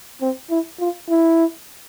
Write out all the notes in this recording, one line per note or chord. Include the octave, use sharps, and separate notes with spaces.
C4
E4
F4
E4